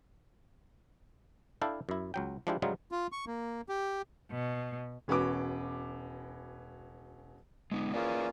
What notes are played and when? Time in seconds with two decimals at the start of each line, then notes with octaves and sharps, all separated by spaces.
1.62 D4 E4 A4 F5 G5 A5
1.89 F#2 E4
2.14 C#2 F#3 G5
2.47 F3 G#3 D4 E4 F4 G4
2.62 G#2 C#3 F#3 G3 D#4 F4
2.92 F4
3.12 C#6
3.27 A#3
3.69 G4
4.31 B2
5.08 E1 C#4 F#4 B4 D6
7.72 G#3 B3 D#4
7.94 A#3 C#4 F4 G#4 B4 D5